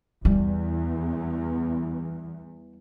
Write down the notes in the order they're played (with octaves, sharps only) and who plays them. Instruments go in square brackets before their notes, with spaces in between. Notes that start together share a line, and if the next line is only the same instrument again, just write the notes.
[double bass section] E2 [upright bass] G3